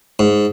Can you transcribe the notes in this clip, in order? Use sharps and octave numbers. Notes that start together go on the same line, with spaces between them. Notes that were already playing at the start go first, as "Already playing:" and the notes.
G#2